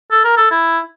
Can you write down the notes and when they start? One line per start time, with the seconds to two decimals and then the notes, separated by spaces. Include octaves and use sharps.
0.11 A4
0.24 A#4
0.37 A4
0.51 E4